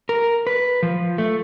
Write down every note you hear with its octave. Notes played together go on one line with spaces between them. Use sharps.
A#4
B4
F3
A3